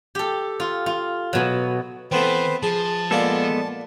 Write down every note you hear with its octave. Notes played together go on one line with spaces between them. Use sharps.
G4 A4
F4
F4
B2 F#3
E3 A3 B3 C4 B4 C5
F3 G#4 A5
A#2 G#3 B3 D4 F4 A4